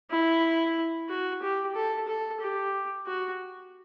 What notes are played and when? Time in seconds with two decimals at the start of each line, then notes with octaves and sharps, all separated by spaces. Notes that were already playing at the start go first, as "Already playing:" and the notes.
0.11 E4
1.10 F#4
1.42 G4
1.75 A4
2.08 A4
2.41 G4
3.07 F#4